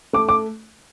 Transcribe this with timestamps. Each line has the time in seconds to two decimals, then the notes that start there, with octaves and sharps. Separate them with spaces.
0.13 A3 D6
0.29 D6